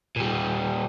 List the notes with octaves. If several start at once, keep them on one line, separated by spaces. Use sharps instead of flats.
A#2 G3